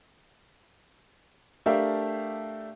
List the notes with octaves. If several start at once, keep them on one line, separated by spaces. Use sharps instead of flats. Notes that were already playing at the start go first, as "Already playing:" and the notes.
A3 D4 G4 A#4 E5 F5